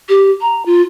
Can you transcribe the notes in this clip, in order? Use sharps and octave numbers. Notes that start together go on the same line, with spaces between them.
G4
A#5
F4